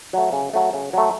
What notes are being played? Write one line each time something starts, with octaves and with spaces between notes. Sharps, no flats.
F#3 A3
C#3
F#3 A3
C#3
F#3 A3